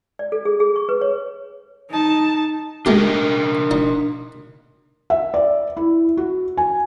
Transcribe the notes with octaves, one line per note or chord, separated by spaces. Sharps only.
D5
A4
G#4
G#4
C#6
B4
C#5
D#4 A5
G#3 A3 D4 G4 A#4 D#5
D#4
E5
D5
E4
F#4
G#5